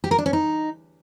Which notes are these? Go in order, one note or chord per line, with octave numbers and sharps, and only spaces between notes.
G4
A#4
D4
C#4
D#4